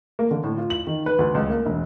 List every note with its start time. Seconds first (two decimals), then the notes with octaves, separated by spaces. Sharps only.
0.19 A#3
0.31 D3
0.44 A2
0.58 F4
0.70 F#7
0.87 D#3
1.06 B4
1.19 D2
1.34 C#2
1.50 A#3
1.66 E1